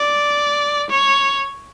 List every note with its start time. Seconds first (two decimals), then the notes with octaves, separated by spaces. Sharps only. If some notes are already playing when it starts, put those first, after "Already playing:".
Already playing: D5
0.90 C#5